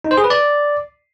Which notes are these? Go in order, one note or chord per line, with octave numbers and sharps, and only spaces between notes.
D#4
C5
G#4
B4
D5